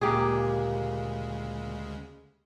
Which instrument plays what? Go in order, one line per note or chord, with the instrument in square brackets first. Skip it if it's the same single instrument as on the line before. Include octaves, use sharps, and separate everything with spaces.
[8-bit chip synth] D2 C#3 G#3 [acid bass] A#2 [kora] A#3 G4 G#4